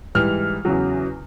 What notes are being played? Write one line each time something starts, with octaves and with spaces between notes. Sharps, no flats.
G#2 E3 G3 F6
E2 C#3 F#3